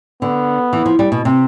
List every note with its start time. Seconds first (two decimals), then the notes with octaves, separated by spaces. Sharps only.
0.22 D3 B3
0.73 E3
0.86 F3
0.99 G3
1.12 B2
1.25 C3